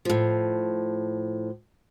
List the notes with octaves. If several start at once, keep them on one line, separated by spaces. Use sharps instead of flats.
A2 F3